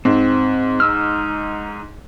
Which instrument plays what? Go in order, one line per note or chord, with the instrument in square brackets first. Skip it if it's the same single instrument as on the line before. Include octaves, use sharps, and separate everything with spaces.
[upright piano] G#2 [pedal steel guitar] C4
[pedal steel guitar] D#4 E6 F6